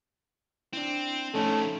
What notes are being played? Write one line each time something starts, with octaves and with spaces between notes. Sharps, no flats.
C4 D4 E4
A2 F3 A3 C#4 D#4 A4